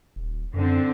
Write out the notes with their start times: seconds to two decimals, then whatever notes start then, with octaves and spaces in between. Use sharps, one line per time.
0.16 D#1
0.54 F#2 D3 C4